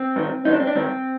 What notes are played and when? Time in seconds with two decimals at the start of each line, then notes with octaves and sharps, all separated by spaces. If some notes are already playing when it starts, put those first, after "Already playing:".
Already playing: C4
0.16 G2 D#3
0.45 G2 D#3 D#4
0.53 D4
0.60 C4
0.67 D4
0.76 G2 D#3 C4